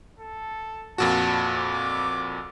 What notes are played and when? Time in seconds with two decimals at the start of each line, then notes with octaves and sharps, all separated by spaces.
0.19 A4
0.98 F2 A#2 F#4 A5
1.57 D6